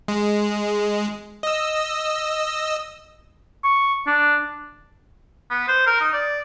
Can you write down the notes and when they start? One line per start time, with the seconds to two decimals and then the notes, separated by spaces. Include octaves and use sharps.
0.08 G#3
1.43 D#5 E6
3.64 C#6
4.07 D4
5.50 B3
5.68 C5
5.86 A#4
6.01 D#4
6.13 D5